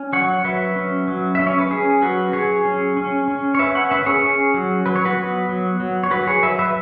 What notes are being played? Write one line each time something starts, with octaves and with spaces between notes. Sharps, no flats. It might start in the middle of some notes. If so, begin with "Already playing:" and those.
Already playing: C#4
F#3 C#5 F#5
F#3 B4 E5
C#4
F#3
C#4 E5
C#5
B4
C#4 G#4
F#3 F#4 B4
F#3 G#4 C#5
C#4
C#4
C#4
C#5
C#4 B4 E5
C#5 F#5
C#4 B4 E5
G#4 C#5
C#4
F#3
F#3 B4
C#5
F#4 B4
B3
F#3
F#3
C#5
F#3 F#4 B4
G#4 C#5
F#3 B4 E5
B4 E5